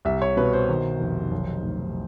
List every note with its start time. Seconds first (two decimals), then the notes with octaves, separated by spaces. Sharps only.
0.05 C2 E5
0.22 C#5
0.37 B2 B4
0.53 C5
0.69 D#3
1.00 F1
1.31 B1
1.63 A2